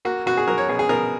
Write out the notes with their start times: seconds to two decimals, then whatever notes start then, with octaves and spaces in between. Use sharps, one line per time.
0.05 A#3 F#4
0.26 B2 F#4
0.37 G#4
0.47 F#3 A#4
0.58 C#5
0.69 B2 G#4
0.79 G#4
0.89 B2 A#4